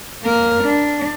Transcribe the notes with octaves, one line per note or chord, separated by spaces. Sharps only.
A#3 A#4
D4